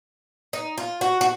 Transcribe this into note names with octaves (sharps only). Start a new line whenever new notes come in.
D#4
F4
F#4
F#4